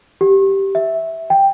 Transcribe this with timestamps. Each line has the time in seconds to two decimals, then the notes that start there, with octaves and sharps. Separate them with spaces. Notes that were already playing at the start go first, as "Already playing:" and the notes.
0.21 G4
0.75 E5
1.30 G5